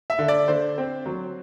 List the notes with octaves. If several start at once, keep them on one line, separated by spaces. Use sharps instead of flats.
E5
D3
D5
D3 C5
C4
F#3